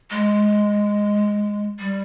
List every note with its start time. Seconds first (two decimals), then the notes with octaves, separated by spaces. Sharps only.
0.11 G#3
1.79 G3